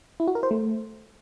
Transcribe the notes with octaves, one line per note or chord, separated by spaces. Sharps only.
E4
F#4
A#4
C5
A3